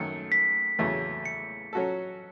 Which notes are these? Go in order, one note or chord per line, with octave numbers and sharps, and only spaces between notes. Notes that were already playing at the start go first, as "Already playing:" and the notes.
Already playing: F#2 D#3 A3 C#7
B6
E2 C#3 F#3 A3 E4
C#7
F#3 C#4 F#4 A4